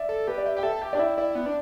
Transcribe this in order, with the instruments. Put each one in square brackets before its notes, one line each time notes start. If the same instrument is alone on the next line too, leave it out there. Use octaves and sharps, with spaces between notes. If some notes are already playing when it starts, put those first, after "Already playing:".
Already playing: [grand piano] D5 E5
[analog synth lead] A4
[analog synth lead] G4 [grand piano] B4
[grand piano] D5
[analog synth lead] G4 [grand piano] E5
[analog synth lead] G4 [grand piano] G5
[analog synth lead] A4 [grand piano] E5
[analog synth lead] G4 [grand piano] G5
[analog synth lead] D4 [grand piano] D5
[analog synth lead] E4 [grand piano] E5
[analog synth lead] E4 [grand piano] D5
[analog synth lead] B3
D4